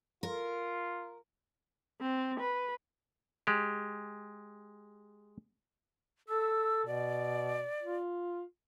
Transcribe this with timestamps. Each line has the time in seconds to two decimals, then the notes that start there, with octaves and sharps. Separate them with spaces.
0.23 F4 A#4
2.01 C4
2.40 B4
3.47 G#3 G4
6.29 A4 E6
6.86 B2 D5
7.83 F4